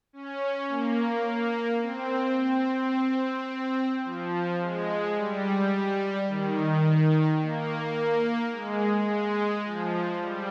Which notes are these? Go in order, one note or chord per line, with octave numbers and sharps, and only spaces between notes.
C#4
A#3
C4
C4
F3
G#3
G3
D#3
A#3
G#3
G#3
F3
G3